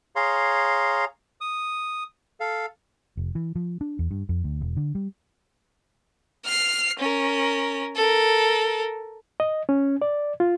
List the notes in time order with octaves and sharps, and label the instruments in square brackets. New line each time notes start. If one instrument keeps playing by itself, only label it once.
[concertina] G#4 C#5 F5 A#5 C6
D#6
A4 F5
[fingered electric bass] F1
E3
F3
D4
E2
G2
F2
D2
E1
D3
G3
[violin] F6 C7
C#4 A#4
A4 A#4
[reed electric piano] D#5
C#4
D5
F4